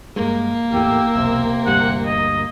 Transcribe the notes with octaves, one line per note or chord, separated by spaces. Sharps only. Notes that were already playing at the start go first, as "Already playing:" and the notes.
G2 G#3 A#3
E2 A2 G4 E6
E1 B1 C3
D2 G2 G3 F#5
D#5